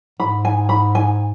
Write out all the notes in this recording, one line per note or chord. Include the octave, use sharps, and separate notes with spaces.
G#2 B5
G#5
B5
G#5